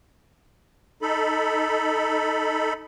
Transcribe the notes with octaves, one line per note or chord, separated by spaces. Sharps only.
D#4 A4 B5